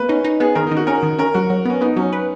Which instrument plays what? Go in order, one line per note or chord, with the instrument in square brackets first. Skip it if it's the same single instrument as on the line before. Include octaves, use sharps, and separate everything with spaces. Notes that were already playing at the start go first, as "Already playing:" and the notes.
Already playing: [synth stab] A#3 B3 [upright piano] B4
[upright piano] C#4 [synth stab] D#4
[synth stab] D#4
[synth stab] B3 [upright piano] G#4
[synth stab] D#3 [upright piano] A#4
[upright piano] D#4
[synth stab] D#3
[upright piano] F#4
[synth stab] C#4 [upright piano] A#4
[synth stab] D#3
[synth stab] C#4 [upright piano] A#4
[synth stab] F#3 [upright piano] F#4
[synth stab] F#3
[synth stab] B3 [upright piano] C#4
[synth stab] B3 [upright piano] D#4
[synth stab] F#3 [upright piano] C#4
[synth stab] B4